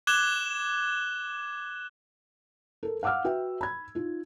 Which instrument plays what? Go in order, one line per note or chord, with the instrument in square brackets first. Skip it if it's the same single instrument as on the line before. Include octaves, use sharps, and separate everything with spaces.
[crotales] D6 F#6 G#6 E7 G7
[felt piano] A4 A#4
F5 F#5 D6 E6 F6
F#4 B4 E5 G5
B5 G#6
D#4 F4